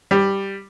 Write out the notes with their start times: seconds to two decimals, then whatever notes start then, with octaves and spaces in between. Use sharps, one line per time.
0.11 G3